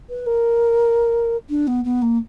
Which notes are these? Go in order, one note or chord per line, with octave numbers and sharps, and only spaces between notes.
B4
A#4
D4
B3
B3
A#3